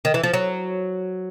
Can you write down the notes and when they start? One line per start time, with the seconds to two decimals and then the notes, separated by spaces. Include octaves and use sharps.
0.05 D#3
0.14 E3
0.23 F3
0.34 F#3